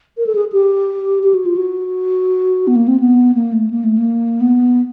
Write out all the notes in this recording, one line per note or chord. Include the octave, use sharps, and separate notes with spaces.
A#4
A4
G#4
G4
G4
F#4
F4
F#4
B3
A#3
C4
B3
A#3
A3
A#3
A3
A#3
B3